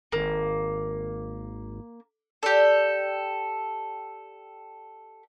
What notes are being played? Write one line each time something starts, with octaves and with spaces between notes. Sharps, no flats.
G#1 A#3
G4 A4 D5